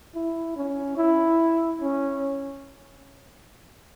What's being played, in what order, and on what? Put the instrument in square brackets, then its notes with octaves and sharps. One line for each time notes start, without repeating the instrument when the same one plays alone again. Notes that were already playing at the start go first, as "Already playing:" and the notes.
[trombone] E4
C#4
E4
C#4